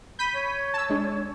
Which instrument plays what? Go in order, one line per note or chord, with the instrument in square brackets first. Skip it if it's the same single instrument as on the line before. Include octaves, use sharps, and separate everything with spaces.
[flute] B5 [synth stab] G6 B6 D#7
[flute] C#5
[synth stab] A5 E6
G#3 D4